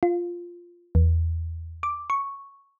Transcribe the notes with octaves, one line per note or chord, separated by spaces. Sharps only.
F4
E2
D6
C#6